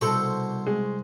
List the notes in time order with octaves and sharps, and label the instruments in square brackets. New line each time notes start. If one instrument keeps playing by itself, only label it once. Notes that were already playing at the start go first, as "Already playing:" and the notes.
[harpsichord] C2 C5 C#6 [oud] B2 A4
[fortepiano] G#3